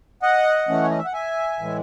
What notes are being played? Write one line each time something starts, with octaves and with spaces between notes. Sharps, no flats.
D#5 F#5
E3 A3 C#4
C#5
D#5
E5
F#5
E5 G#5
A2 E3 G#3